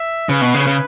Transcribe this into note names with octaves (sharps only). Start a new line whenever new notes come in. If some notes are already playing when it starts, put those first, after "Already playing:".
Already playing: E5
C#3 B4
B2
C#3
C#3